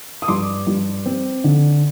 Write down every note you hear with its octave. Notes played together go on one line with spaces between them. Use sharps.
D#6
G2 C6 D6
G2
C4
D3